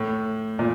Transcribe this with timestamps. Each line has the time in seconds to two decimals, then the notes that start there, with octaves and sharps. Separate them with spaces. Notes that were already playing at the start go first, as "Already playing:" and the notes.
Already playing: A2
0.59 A#2